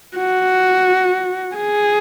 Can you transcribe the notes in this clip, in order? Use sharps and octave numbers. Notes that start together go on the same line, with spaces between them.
F#4
G#4